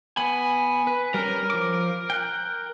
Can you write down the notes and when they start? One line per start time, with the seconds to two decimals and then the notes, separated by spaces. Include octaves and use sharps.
0.17 B3 G#5 B5
0.87 B4
1.14 G3 C#4 A#4
1.50 F3 D6
2.10 G5 F#6